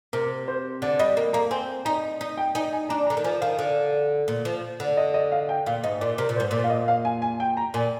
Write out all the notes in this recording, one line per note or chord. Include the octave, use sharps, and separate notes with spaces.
C3 A#4
C5
D3 D5
G3 D#5
A#3
A#3 A#5
C4 G#5
D#4 A#5
D#4
G5
D#4 G#5
G#5
D4 A#5
A#5
D3
D#3
F3 G#5
D#3 F5
D3
A#2
F3
D3
D#5
D#5
F5
G5
A#2 F5
G#2 D#5
A#2 D5
C3 A#4
A#2
C5
G#2
A#2 D5
F5
D#5
F5
G#5
G#5
G5
A#5
A#2 G#5